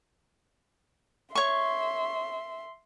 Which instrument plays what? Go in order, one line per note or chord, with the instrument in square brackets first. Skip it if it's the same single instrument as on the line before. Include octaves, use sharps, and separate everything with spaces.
[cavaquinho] C#5 C#6 [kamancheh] E5 C6